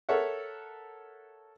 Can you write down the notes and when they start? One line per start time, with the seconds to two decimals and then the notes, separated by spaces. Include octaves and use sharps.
0.09 A4 A#4 C#5 E5 F#5